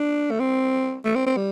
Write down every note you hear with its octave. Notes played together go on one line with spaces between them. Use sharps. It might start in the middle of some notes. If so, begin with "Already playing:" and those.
Already playing: D4
A3
C4
A3
C4
C4
G3